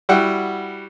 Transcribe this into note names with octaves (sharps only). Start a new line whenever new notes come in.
G3 E4 F#4 F#5 G5